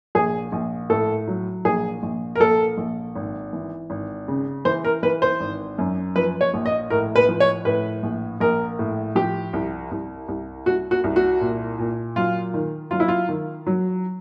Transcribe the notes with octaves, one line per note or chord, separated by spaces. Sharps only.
A#1 G#4
A#1
A2 A4
F#3
A#1 G#4
A#1
A#4
A#1 A4
A#1
G#1
E3
G#1
C#3
E3 C5
A#4
E3 B4
C5
G#1
F#2
F3 B4
C#5
A#1
D#5
A2 A#4
B4
F3
C#5
A2 B4
A#1
A#1 A#4
A2
F3 G4
C2
C2
C2
C2 F#4
F#4
C2
F#4
A#2
A#2
F#3 F4
D#3
F#3 F4
E4
F4
D#3
F#3